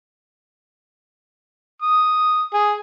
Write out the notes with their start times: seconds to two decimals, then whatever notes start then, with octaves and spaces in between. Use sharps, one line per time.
1.82 D#6
2.54 G#4